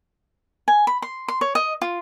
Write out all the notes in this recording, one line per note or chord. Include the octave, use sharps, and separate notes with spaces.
G#5
B5
C6
C6
C#5
D#5
F4